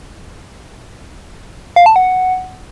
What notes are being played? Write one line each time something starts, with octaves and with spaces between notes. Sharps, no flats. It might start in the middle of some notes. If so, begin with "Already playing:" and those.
F5
A5
F#5